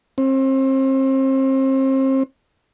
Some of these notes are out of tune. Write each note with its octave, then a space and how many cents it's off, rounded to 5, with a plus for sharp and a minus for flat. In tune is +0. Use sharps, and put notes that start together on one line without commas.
C4 +35